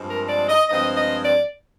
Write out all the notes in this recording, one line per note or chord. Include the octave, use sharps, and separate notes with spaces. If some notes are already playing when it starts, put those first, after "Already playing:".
Already playing: G2 F3 G#3 C4
A#4
D5
D#5
G2 F3 G#3 C4 D#5
D#5
D5